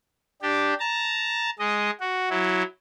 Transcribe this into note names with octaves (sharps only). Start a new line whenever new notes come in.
D4 G4
A5 A#5
G#3 D#5
F#4
F#3 E4